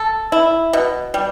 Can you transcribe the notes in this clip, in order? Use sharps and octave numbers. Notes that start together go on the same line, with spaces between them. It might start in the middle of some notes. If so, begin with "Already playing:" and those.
Already playing: A4
E4
B2
G3